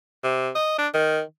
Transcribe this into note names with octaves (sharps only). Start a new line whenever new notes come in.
C3
D#5
D4
D#3